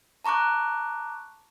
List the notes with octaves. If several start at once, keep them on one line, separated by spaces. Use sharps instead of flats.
A5 A#5 C#6 D6 F#6